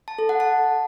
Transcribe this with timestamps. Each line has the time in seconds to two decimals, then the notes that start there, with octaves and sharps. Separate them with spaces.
0.08 A5
0.18 A4
0.29 F#5
0.40 A5